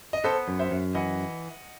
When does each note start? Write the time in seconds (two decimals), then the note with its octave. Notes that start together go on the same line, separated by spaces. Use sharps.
0.13 D#5
0.24 B3 A4 C5
0.48 F#2
0.59 C5 E5
0.71 F#2
0.95 E3 D#5 F#5